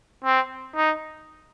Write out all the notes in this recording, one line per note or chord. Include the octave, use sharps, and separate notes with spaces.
C4
D#4